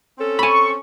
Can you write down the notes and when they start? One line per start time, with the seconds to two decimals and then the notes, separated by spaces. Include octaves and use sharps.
0.18 C4 C#4 A4
0.39 G#5 B5 C#6